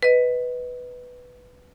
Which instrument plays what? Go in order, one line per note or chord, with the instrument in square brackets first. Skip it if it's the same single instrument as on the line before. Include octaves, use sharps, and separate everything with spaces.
[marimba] B4 D#5